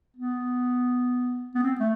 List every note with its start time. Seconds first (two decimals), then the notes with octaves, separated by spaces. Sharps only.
0.17 B3
1.55 B3
1.63 C4
1.80 A3